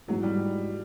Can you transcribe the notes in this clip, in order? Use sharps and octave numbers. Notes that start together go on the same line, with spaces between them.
G#2 E3 F#3 G#3
G3